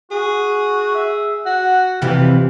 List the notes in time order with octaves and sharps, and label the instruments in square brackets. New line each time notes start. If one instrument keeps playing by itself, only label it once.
[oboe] F#4 [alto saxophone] G#4
[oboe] E5
[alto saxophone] F#4 [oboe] F#5
[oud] F2 C3 E3 [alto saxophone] G4 [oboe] F5